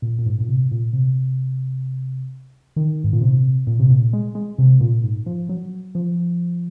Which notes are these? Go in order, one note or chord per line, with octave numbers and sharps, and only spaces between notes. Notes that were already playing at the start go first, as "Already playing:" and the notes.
A#2
A#2
G#2
A#2
C3
A#2
C3
D#3
G#2
A#2
C3
A#2
C3
A#2
G#3
G#3
C3
A#2
G#2
F3
F#3
F3